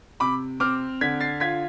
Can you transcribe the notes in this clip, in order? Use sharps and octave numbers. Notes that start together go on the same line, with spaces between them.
C3 B5 D6
C4 D6 F6
D3 G#6 B6
A6 C7
F4 G#6 B6